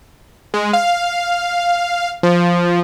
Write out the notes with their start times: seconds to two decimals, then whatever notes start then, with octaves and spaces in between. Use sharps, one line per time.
0.54 G#3
0.73 F5
2.23 F3